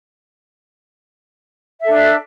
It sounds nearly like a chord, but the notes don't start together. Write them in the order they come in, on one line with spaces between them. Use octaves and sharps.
E5 A4 D4